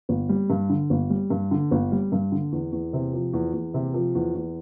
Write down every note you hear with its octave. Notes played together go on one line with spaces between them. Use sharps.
G1
G3
G2
D3
G1
G3
G2
D3
G1
G3
G2
D3
E2
E2
C3
F3
E2
E2
C3
F3
E2
E2